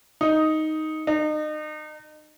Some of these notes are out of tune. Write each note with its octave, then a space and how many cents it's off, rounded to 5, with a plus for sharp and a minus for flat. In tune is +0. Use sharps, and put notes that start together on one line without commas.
D#4 +5
D#4 -35